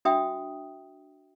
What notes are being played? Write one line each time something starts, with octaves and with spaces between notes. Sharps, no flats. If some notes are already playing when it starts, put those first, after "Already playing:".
D4 F#4 E5 G5 D#6